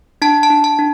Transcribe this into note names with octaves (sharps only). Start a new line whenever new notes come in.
D4 A5
A5
D4
A5
D4